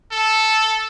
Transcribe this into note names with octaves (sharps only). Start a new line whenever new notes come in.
A4